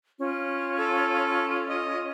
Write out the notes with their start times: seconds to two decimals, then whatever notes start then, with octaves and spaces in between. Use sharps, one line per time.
0.19 C#4 F4
0.79 A4
1.69 D#5